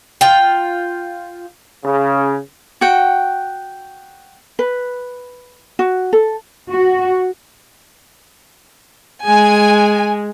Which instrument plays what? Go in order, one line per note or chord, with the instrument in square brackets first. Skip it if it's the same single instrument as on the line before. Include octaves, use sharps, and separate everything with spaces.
[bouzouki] F4 G5
[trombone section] C#3
[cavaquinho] F#4 F#5 G5
[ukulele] B4
F#4
A4
[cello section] F#4
[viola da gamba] G#3 [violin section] G#5